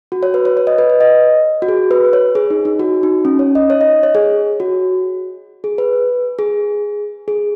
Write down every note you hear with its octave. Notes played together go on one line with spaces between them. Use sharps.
F#4
C#5
B4
C#5
C#5
D#5
B4
B4
D#5
F#4
G#4
B4
C#5
G#4
D#4
D#4
F#4
D#4
C#4
C#5
D#5
C#5
D#5
C#5
G#4
F#4
G#4
B4
G#4
G#4